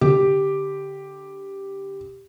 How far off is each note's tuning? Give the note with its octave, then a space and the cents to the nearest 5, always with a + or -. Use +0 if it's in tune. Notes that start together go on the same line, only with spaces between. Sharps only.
D3 -25 G4 +0